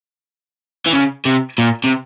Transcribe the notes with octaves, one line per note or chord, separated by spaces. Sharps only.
E3
C#3
C3
A#2
C3